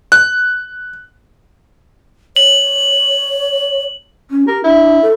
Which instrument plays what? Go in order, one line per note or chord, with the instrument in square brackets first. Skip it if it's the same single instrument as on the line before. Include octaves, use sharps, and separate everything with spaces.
[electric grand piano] F#6
[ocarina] C#5 [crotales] F#7
[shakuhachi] C#4
[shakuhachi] G4 [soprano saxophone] A#4
[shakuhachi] D4 [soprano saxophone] E4
[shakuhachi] A4